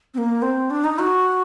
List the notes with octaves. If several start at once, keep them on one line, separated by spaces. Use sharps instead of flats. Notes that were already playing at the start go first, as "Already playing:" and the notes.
C4
A#3
C4
D4
D#4
F#4